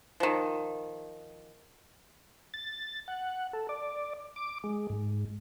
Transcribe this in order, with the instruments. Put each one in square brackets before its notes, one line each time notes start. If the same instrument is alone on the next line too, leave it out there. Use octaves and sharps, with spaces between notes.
[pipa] D#3 F3
[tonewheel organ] A6
F#5
A4
D5
D6
G#3
G#2